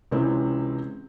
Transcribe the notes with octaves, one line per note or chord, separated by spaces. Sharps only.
C#2 C3 E3 C4 C#4